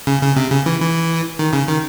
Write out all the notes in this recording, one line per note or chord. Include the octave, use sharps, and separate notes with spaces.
C#3
C#3
C3
C#3
E3
E3
D#3
C#3
D#3